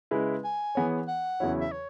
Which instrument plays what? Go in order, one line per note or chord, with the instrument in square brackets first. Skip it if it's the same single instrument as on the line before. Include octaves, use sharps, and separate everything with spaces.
[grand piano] C#3 G#3 E4 B4
[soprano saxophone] G#5
[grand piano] E3 B3 G#4 C#5
[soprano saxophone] F#5
[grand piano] E2 C#3 F#3 E4 C#5
[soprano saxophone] E5
C#5